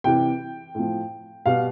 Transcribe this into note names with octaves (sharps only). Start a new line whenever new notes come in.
C3 E3 G3 G5
A2 F3
B2 G3 F5